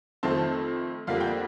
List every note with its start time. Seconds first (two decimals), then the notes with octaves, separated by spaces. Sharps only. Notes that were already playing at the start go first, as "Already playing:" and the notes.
0.23 F2 D#3 A3 C4 A5
1.07 F2 D3 G3 A#3 F5
1.20 G5